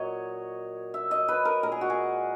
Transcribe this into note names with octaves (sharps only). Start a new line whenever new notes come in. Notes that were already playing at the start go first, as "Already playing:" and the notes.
Already playing: A#2 F#3 C#5 D#5
E5
D#5
B4
A#4
A#2 G#3 A#4
G#4
F#4
G#4